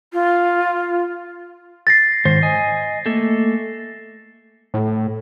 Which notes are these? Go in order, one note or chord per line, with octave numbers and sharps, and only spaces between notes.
F4
A6 A#6 C7
G#2 D#3 C5
D#5 G#5
A3 A#3 A4
A2